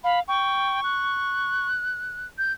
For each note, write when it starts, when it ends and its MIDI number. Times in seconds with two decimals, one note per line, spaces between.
0.04 0.20 77
0.04 0.20 83
0.28 0.80 79
0.28 1.67 85
0.84 2.27 90
2.38 2.53 91